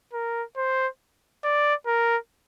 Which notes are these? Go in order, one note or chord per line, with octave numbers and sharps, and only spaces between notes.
A#4
C5
D5
A#4